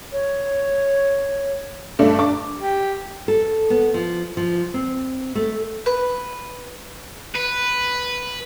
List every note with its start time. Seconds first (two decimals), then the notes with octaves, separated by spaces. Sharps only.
0.12 C#5
1.99 G2 A3 D4
2.19 D4 D6
2.59 G4
3.28 A4
3.70 B3
3.94 F3
4.37 F3
4.74 C4
5.35 A3
5.86 B4
7.35 B4